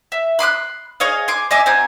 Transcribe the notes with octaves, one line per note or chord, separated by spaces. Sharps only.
E5
B5 C6 D6 F#6
G#4 C#5 D#5 F5
G#5 C6 D6
D#5 E5 G#5 D6
C4 F#4 G#5 A#5